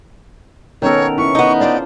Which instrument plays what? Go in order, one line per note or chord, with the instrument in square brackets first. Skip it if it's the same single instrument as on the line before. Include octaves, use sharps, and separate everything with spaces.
[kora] D#3 A4 [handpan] B3 C#4 A#4 [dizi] C#5
[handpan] C#4 E4 [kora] B4 [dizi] C#6
[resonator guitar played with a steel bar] B3 D#4
[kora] D4 F4 C5 [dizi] D5